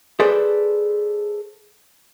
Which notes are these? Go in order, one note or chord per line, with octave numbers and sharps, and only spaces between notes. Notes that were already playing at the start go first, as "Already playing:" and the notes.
G#4 A4 B4 C5 D5